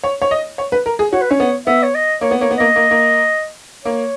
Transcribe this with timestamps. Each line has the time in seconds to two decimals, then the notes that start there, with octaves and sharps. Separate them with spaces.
0.04 C#5
0.22 C#5
0.31 D#5
0.58 C#5
0.72 B4
0.86 A#4
0.99 G#4
1.13 F#4 C#5
1.22 B4
1.31 C#4 C#5
1.40 B3
1.67 B3 E5
1.83 C#5
1.95 D#5
2.21 A#3 C#5
2.31 B3
2.40 A#3 C#5
2.51 B3
2.58 A#3 D#5
2.76 A#3
2.91 A#3
3.85 A#3 C#5